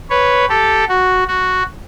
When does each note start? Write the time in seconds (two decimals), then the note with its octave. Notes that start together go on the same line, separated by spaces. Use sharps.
0.10 B4 C#5
0.49 G4 A4
0.88 F#4
1.28 F#4